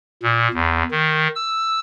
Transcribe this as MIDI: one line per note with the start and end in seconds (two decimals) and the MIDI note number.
0.23 0.48 46
0.53 0.83 40
0.91 1.28 51
1.35 1.80 88